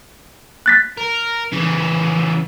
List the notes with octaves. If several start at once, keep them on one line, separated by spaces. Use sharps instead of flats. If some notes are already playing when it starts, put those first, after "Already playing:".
F#6 A6 B6
A#4
C#3 E3